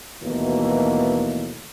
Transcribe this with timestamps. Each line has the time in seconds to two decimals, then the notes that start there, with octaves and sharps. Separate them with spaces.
0.23 D#2 B2 E3 F#3 A3 A#3